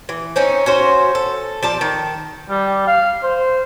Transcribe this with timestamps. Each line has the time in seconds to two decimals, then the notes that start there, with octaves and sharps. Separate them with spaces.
0.09 E3
0.36 C4 C#4 D#4
0.66 C#4 F#4 C5
1.15 A4
1.63 F3 D5 A5
1.81 D#3
2.49 G3
2.87 F5
3.23 C5